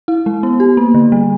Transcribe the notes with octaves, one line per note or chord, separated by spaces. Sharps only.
E4
G#3
B3
G4
A#3
D3
G3